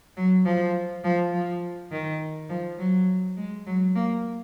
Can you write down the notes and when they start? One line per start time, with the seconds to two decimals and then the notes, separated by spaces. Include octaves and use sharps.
0.17 F#3
0.45 F3
1.04 F3
1.33 F3
1.92 D#3
2.50 F3
2.79 F#3
3.37 G#3
3.67 F#3
3.96 A#3